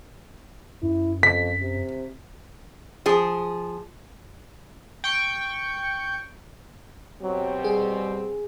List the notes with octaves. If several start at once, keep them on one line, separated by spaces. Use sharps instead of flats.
F#2 E4
F2 B6
C3
F3 G#4
G5 C#6
B2 F#3 C4 G4
G3 G#4